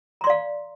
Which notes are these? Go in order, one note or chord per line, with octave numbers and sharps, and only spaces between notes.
D5 F5 A#5 C6